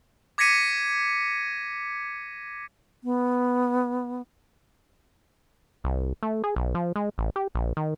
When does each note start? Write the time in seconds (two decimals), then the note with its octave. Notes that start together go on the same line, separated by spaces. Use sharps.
0.38 D6 G#6 A#6 B6 C#7 D#7
3.04 B3
5.84 C2
6.23 A3
6.44 G#4
6.56 B1
6.75 F3
6.96 G#3
7.18 A1
7.36 G4
7.55 A#1
7.77 D#3